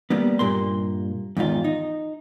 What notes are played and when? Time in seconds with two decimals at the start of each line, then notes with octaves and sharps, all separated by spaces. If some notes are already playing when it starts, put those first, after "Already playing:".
0.10 G3 A#3 B3
0.39 G2 A#2 A#3 C6
1.37 E2 G#2 D#3 F4
1.64 D#4